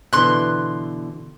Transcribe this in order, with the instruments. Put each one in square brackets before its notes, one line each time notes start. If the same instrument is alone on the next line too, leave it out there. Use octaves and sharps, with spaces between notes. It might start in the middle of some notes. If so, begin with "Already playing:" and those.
[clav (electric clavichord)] B2 D3 E3 [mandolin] C6 F#6